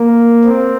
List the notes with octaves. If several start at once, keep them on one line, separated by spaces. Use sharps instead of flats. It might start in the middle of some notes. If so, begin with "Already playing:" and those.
Already playing: A#3
C4